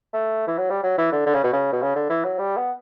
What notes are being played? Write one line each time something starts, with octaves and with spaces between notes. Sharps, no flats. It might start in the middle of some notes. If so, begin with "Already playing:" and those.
A3
E3
F#3
G3
F#3
E3
D3
D3
C#3
B2
C#3
B2
C#3
D3
E3
F#3
G3
B3